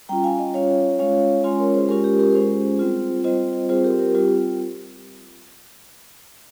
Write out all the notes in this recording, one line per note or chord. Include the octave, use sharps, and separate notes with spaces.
G3 C#4 F4 G5 A#5
F5 G#5
D#5 G5
G3 C#4 F4 C#5 F5
G#3 C#4 F4 C#5 F5
G#3 C#4 F4 G#5 C6
A#4 C#5
G#4 C5
G#3 C#4 F4 G4 A#4
G4 A#4
G4 A#4
A#4
G#3 C#4 F4 G#4 C5
G3 C4 F4
G3 C4 F4 C5 D#5
G3 C4 F4 G#4 C5
G4 A#4
G4 A#4
G3 C4 F4 G4